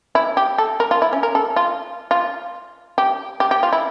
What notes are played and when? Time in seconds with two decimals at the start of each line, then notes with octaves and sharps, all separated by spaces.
0.15 E4
0.37 G4
0.58 A4
0.80 A#4
0.91 F4
1.02 E4
1.13 C#4
1.23 A#4
1.35 A4
1.56 F4
2.11 F4
2.98 G4
3.40 G4
3.51 G4
3.63 F4
3.73 E4